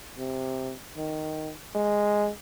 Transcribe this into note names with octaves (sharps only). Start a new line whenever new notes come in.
C3
D#3
G#3